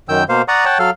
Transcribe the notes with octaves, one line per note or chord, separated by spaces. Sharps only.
F#2 D#3 G5 E6 G6
B2 A#3 C5 F5
D5 F#5 A#5 C#6 D#6
C#5 F#5 G5 A5
F#3 A4 F5 F6